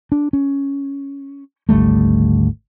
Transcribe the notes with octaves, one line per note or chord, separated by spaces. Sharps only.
D4
C#4
G#1 D2 G3 A3